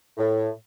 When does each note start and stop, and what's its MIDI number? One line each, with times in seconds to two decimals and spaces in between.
0.18 0.49 45